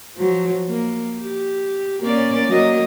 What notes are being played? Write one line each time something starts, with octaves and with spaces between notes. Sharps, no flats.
F3 F#3
A#3
G4
A#3 C#4 D5
F#3 A#3 D#5